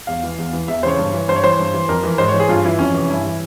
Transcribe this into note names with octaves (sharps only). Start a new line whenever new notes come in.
E2 F5
E3
E2
E3
E2 E5
C#3 E3 C5 C#5
G2
E3
G2 C5
C#5
E3 C5
G2
E3
F2 A#4
E3
G#2 C5
C#5
E3
G#4
G2 F4
E3 E4
F2 C#4
C3 E3
G2 E4
E3